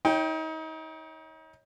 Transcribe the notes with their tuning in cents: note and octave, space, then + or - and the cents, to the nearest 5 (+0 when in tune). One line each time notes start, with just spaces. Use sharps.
D#4 +35 C#5 +0 G5 +0